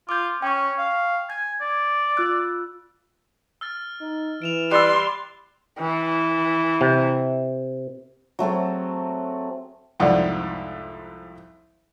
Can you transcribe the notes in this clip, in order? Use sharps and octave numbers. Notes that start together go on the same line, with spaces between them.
F4 D6 G6
C#4 G5 C#6
F5
G#5 G#6
D5
F4 E6 F#6
E6 F6 A6
D#4
E3 D7 E7 F7
G3 C6 E6 F#6 A6
E3
C3
F#3 A3 C4 G#4
C2 F2 G#2 A#4 D5 F#5